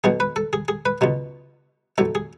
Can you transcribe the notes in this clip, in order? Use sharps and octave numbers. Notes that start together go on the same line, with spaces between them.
B1 B2 F#3 G#4
B4
A4
G#4
G#4
B4
C#2 B2 F#3
B1 A2 F#3 A4
G#4